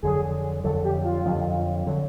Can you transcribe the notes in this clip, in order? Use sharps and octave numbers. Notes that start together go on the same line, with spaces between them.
F2 D3 F#3 G#4
F2 D3 F#3 A4
G4
F4
F2 D3 F#3
D3 F#3